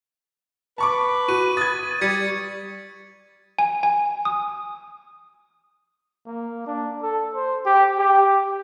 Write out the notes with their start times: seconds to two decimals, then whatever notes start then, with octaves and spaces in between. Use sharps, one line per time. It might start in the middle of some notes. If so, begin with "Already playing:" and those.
0.78 B4 A5 C#6 D6
1.28 F#4 C#6 D#7
1.57 D#6 G#6 A6
2.01 G3 D5 G#6 B6 C#7
3.59 G#5
3.83 G#5
4.25 D#6
6.26 A#3
6.67 D4
7.02 A4
7.35 C5
7.66 G4
7.98 G4